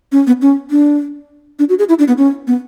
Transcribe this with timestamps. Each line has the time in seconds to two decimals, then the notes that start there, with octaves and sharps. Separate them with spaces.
0.12 C#4
0.27 B3
0.42 C#4
0.71 D4
1.59 D4
1.69 F#4
1.79 G#4
1.89 E4
1.99 D4
2.08 B3
2.18 C#4
2.47 B3